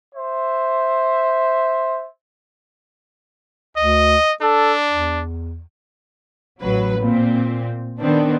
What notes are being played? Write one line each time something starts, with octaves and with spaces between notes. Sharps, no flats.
C5 E5
D2 D#5
D4 A4
E2
A1 F#3 B4
A#2 C4
D#3 B3 C4 D4